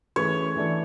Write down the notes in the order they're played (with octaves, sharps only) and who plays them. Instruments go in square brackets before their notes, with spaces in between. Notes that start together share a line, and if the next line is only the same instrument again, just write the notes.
[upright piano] E3 A3 C#4 G#4 B4 [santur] C#5
[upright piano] E3 A3 D4 A4